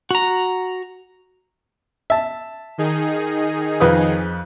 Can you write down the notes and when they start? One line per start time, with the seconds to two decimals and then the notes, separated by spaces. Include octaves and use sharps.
0.11 F#4 A#5
2.10 E5 A5
2.78 D#3 D#4 G#4
3.80 F2 B4 D#6